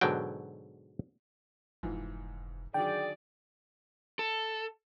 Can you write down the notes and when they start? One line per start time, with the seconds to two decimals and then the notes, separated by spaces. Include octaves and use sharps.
0.01 G#2 B2 D3 F#3 G5
1.83 F1 G#2 E3 F3
2.74 D3 D#3 F#3 G#4 D5 G5
4.19 A4